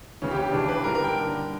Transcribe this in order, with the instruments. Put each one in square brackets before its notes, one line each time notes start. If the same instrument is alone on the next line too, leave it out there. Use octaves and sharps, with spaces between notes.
[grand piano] D2 C#3 E3 C#4
G4
G4
D2 C#3 E3 D4
B4
G2 D3 A#4
A#4
G5
G2 D3